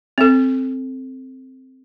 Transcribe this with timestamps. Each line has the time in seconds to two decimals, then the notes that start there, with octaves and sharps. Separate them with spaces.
0.18 C4 A4